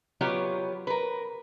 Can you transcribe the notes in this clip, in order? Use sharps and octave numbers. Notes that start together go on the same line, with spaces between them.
F#3 B3 F4 G4 C#5 D5
A#4 B4